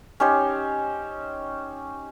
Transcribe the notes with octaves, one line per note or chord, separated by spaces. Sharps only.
C#4 D#4 G4 C5